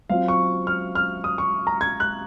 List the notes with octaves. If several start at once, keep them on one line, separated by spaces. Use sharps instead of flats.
F#3 C4 F4 F5
C#6
F6
F6
D#6
C#6
A#5
G#6
F#6